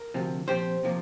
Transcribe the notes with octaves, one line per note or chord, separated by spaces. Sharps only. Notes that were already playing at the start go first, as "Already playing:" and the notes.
Already playing: A#4
D2 C3 F3
A#2 F3 C4 G4 C5
C3 F3 A#3